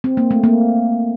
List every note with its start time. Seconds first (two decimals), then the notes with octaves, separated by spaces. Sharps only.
0.04 C4
0.17 A#3
0.31 A3
0.44 A#3